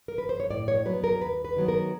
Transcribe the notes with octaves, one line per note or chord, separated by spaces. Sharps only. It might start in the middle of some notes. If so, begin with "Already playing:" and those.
A#4
B4
C5
C#5
A2 D5
C#5
F#3 B3 B4
A#4
D#2 B4
B4
D#3 F#3 B3
A#4